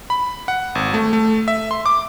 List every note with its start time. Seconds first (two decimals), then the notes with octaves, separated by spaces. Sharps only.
0.10 B5
0.48 F#5
0.75 G#1
0.94 A3
1.13 A3
1.48 E5
1.71 C6
1.86 D6